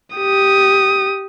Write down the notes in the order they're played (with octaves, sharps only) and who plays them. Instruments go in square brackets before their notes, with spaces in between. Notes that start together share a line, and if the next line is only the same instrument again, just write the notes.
[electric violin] G4 D#6